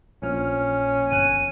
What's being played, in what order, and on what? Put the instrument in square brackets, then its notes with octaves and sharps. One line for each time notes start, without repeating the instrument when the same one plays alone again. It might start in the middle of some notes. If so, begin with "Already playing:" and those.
[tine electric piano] A#1 A#2 F6 [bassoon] C#4
[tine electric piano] G1 G#5 F#6 [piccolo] D#7